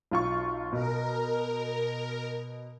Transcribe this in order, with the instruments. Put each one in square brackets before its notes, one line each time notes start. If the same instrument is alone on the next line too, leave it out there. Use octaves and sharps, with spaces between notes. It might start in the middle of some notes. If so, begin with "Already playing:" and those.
[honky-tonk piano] B1 F4 C#6
[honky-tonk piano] B2 [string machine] A#4